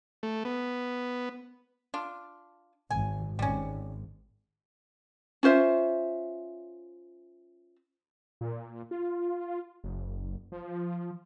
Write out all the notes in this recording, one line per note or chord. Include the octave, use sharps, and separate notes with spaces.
A3
B3
D4 F4
G#1 G#5
G#1 G3 C#4
C#4 F4 C5 E5
A#2
F4
F#1
F3